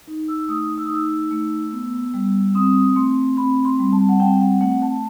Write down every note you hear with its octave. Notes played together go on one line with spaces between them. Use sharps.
D#4
E6
E6
A3 D#6
E6
D#6
D#4 E6
A3
B3
G3
C4 D#6
A3 C6
C4 B5
C6
G3
A5
F#5
C4 G5
F#5
A3 F#5
A5